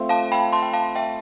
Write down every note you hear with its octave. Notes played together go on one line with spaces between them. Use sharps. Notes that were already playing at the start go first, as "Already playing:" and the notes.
Already playing: A3 C4 F4
F5 A5
G5 B5
A5 C6
G5
F5 A5
E5 G5